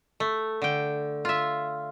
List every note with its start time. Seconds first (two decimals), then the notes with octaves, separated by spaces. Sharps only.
0.20 A3
0.62 D3 G5
1.25 F4 E5